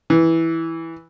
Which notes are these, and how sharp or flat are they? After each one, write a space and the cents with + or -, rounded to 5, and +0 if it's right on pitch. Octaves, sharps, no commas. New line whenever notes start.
E3 -5